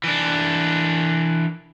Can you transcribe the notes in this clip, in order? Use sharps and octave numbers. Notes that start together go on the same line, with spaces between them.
E3 D4